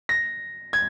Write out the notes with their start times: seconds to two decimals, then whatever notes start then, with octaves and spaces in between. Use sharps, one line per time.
0.09 A#6
0.73 G#6